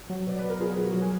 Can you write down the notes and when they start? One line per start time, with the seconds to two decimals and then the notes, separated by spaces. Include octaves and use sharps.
0.10 F#3
0.27 B2 D5
0.39 F#3 B4
0.50 A#4
0.60 B2 F4 G#4
0.76 F#3 B4
0.86 F#4 A#4
0.94 F#3
1.01 G#4